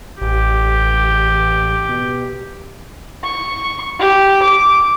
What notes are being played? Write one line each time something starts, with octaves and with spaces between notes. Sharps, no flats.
A1 G4
B2
C#6
G4
D6